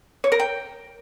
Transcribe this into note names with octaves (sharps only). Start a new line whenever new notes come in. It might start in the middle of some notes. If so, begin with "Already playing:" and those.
C#5
A#4
G5